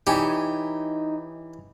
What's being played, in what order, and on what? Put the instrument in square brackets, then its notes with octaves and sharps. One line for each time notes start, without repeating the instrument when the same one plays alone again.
[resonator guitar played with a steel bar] E3 C#5 G#5 [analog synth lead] D#4 [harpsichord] G4